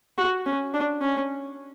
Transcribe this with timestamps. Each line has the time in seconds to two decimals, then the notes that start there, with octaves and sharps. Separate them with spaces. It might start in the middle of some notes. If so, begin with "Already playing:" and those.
0.18 F#4
0.46 C#4
0.74 D4
1.01 C#4